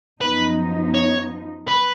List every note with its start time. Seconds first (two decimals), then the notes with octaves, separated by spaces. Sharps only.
0.21 F#2 F3 B3 D#4 B4
0.94 C#5
1.68 B4